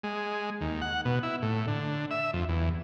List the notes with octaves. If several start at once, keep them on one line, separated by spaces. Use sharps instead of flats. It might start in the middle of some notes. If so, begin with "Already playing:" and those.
G#3
D#2
F#5
B2
E4
A2
D3
E5
F2
E2